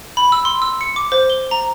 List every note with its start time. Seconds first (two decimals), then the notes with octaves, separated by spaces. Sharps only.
0.17 B5
0.32 E6
0.45 C6
0.62 E6
0.81 C#7
0.96 D6
1.12 C5
1.30 G7
1.51 A#5